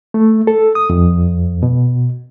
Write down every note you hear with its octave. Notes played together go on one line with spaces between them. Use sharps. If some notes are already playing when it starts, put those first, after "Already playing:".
A3
A4
D#6
F2
B2